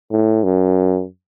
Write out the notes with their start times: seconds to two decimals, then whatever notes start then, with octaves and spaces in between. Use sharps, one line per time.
0.11 A2
0.44 F#2